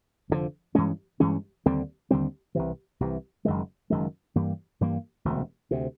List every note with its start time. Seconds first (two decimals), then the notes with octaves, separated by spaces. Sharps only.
0.30 F1 D#2 D3 F3
0.75 G2 E3 G#3 C#4
1.20 G2 E3 G#3 C#4
1.66 D#2 D3 G3 C4
2.11 D#2 D3 G3 C4
2.55 C2 C3 E3
3.00 C2 C3 E3
3.45 F#1 F#2 D#3 G#3
3.90 F#1 F#2 D#3 G#3
4.35 G2 E3 G3 A#3
4.81 G2 E3 G3 A#3
5.25 E1 D2 C3
5.71 D2 C3